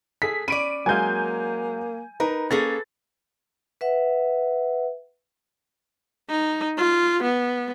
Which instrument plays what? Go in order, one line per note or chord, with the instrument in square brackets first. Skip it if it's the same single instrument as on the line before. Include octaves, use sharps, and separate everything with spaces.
[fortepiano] G#4 A4 [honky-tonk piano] B6
[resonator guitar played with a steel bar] C#4 D5 [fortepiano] B5 [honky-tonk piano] D7 D#7
[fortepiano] F#3 G#3 F5 [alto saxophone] A#3 [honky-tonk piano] G#5 G6
[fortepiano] D#4 B4 [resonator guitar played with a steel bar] A#4
[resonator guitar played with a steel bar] A#3 C#4 G#4 [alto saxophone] A4 [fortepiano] B4 [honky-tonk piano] A6
[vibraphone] B4 E5 F#5
[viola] D#4
F4
B3